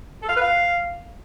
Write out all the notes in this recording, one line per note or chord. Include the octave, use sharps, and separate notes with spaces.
A4
F5
B4
F5